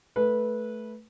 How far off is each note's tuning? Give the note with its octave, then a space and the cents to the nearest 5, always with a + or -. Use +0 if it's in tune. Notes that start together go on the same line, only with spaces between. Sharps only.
A3 -10 B4 -15